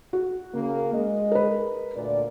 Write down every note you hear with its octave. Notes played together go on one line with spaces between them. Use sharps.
F#4
C#3 A#3
G#3 G#4 D#5
A#4 B4
D2 A#2 D5